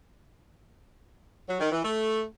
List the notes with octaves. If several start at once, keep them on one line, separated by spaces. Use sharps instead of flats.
F#3
D#3
E3
A3